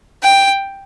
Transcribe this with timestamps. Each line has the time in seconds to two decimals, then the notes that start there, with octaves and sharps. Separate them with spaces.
0.23 G5